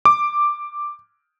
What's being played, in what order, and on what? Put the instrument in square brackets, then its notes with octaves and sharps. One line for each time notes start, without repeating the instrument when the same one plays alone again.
[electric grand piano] D6